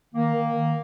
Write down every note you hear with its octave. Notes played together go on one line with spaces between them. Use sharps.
D#3 A#3
D#3
D#3